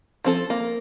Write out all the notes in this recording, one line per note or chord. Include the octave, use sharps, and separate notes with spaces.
F3 C4 A4
A#3